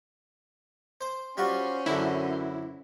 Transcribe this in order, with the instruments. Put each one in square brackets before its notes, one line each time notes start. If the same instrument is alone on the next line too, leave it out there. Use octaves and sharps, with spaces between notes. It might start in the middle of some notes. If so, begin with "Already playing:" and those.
[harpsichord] C5
[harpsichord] G3 F4 F#4 [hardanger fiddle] C#4 C5
[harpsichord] F#2 D3 [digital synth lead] E4